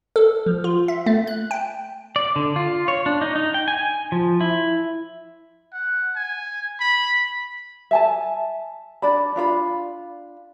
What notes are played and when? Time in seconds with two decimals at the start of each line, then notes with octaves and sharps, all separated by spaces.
0.16 A4
0.46 F3
0.64 F4
0.88 E5
1.06 A3
1.27 F#6
1.51 G5
2.16 D5
2.36 D3
2.56 F4
2.88 C#5
3.06 D4
3.21 D#4
3.36 D#4
3.54 G5
3.68 G#5
4.12 F3
4.41 E4
5.73 F#5
6.16 G#5
6.80 B5
7.91 E5 G#5 A5
9.02 D4 D5 B5
9.36 D4 F4 D5 B5